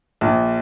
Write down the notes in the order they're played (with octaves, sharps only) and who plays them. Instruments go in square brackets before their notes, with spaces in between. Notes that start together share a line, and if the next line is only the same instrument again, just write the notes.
[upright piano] A#1